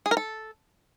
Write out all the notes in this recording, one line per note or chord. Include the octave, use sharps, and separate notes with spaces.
G#4
A#4
A4